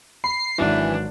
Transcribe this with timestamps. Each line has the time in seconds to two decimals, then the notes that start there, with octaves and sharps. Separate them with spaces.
0.24 B5 C7
0.58 G#1 E3 F#3 D4 C7